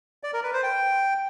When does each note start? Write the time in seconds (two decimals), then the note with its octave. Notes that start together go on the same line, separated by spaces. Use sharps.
0.23 D5
0.33 A#4
0.43 B4
0.53 C5
0.63 G5